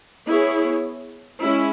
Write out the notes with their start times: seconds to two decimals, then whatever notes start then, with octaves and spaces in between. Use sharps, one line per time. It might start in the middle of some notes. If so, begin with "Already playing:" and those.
0.27 B3 E4 G#4 C#5
1.41 G#3 C#4 E4